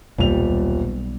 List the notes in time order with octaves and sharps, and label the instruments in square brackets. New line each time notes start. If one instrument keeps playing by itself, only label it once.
[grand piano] D#1 F7 [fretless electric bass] B1 G3